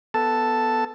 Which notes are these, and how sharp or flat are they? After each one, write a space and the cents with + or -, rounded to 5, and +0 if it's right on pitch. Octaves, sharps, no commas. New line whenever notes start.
B3 +0 A4 +0 A5 +0